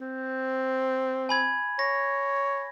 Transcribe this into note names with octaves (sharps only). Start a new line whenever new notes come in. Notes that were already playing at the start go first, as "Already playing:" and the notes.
C4
G#5 B5 G#6
C#5 A#6